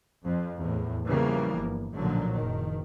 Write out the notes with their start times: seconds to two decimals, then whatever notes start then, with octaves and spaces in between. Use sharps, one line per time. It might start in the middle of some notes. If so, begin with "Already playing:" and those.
0.24 F2
0.59 E2 A2
1.07 C#3 E3 F3 G3 A#3 B3
1.59 G1
1.97 B1 A#2 D3 F3 F#3
2.35 F#1 D#3